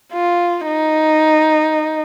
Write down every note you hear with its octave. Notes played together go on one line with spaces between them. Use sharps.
F4
D#4